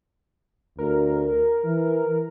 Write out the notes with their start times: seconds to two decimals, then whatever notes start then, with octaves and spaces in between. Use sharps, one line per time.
0.79 D2 A#4
1.64 E3